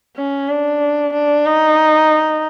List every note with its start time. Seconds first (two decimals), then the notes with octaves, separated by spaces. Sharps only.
0.17 C#4
0.49 D4
1.13 D4
1.46 D#4